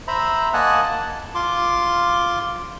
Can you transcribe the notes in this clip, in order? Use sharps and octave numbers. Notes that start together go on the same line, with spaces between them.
C5 E5 A#5 B5
A#3 D#5 F#5 G#5 A5 F#6
A5
F4 C6 D6